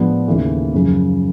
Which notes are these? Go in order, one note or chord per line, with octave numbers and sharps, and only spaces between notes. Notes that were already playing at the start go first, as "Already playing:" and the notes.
Already playing: A2 F3 G#3 B3 D4
D#2 C#3 E3 A3
F#2 C#3 F3